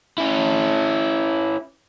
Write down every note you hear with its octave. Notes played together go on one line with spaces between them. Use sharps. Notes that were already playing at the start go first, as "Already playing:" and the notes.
C#4 E4